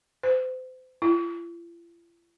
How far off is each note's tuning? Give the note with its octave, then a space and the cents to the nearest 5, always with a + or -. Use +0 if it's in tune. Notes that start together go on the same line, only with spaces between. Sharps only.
C5 -35
F4 -45